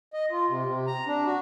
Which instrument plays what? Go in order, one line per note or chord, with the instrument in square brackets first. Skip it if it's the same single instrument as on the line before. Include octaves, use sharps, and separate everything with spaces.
[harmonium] D#5
F4
C3
C3
A#5
D4
F#4